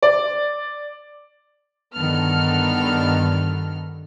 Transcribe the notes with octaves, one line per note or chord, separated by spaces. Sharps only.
D5
G2 D3 D#3 B3 A4 F6